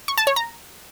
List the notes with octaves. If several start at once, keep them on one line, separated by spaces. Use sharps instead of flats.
C#6
A5
C#5
A#5